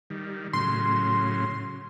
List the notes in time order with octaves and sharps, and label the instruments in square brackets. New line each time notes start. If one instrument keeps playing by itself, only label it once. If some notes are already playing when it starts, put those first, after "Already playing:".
[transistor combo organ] D#3 G3
[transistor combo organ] A2 C#3 F#3 [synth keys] C6